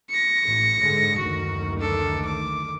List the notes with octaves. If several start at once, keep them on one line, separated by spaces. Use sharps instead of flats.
A#6 C#7
A1
G#2 D3 G#3
F#1 D2 D#3 F#4
D4 A4
D6